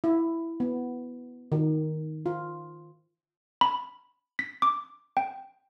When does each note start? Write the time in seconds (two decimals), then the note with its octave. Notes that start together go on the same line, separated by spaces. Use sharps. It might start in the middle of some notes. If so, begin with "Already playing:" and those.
0.04 E4
0.60 B3
1.52 D#3
2.26 F4
3.61 B5
4.39 B6
4.62 D6
5.17 G5